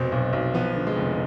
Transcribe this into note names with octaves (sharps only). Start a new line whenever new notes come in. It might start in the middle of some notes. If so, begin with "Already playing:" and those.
Already playing: F1 B2 C4
B1
B1
F3 B3
D3
G#3
F1